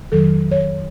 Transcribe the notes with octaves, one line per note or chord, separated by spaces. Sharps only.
F2 D#3 F#3 A4
C#5